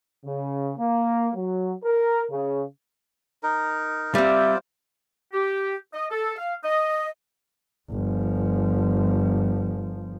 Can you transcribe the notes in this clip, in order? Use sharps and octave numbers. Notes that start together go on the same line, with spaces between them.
C#3
A#3
F#3
A#4
C#3
D#4 A#4
G3 C4 F4 C5 D5 E5
G4
D#5
A4
F5
D#5
G1 F3